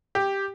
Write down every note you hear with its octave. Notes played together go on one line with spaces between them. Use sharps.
G4